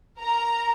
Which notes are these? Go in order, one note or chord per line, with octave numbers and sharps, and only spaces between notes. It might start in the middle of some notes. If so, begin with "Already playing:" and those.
A#4 A#5